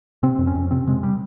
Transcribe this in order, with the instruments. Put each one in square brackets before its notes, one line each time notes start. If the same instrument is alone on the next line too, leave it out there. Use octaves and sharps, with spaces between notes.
[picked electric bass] C3 C4
F2
C#4
F2
C3 C4
C3 G#3
G3